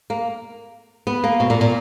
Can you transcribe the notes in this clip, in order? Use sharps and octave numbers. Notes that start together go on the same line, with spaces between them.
A#3
B3
A#3
B2
A#2
A#2